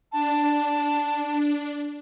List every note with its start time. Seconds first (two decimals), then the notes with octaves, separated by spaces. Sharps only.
0.12 D4 A5